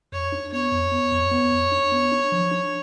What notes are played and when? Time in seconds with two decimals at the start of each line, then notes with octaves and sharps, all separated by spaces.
0.12 F2 C#5
0.32 D4
0.53 B3 C#5
0.72 F2
0.92 B3
1.12 F2
1.32 B3
1.52 F2
1.72 D4
1.92 B3
2.12 D4
2.32 F3
2.52 D4